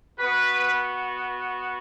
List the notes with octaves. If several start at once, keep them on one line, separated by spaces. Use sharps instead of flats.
B3 F#4 B4